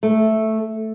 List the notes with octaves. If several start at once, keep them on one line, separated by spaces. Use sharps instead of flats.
A3